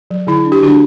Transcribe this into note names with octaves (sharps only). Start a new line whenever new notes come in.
F#3
D3 E4
D4
G4
D3 D4 F#4